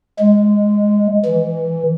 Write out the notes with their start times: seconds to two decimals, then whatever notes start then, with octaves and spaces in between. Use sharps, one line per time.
0.19 G#3
1.25 E3